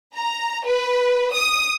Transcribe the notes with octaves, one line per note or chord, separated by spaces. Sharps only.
A#5
B4
D#6